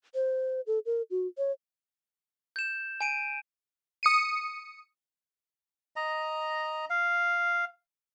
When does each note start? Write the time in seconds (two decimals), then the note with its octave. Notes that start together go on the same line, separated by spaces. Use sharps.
0.15 C5
0.67 A4
0.86 A#4
1.11 F#4
1.38 C#5
2.56 G6 E7
3.01 G#5 D7 D#7
4.03 D#6 C#7 D#7
5.96 D#5 A#5
6.90 F5